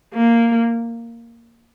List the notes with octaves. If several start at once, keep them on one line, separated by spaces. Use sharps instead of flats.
A#3